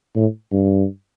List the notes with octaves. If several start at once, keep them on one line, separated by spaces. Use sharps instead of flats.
A2
G2